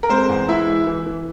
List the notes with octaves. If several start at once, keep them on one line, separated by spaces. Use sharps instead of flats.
A#4
G#3 C4 C5
E2
G#3 E4 E5
E3
E3
E3